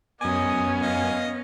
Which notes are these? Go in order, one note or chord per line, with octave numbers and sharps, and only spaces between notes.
F#2 B3 C#4 D#5 G#5 D#6
D#5 F5